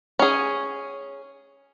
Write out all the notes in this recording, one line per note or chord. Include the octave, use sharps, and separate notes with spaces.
C#4 G#4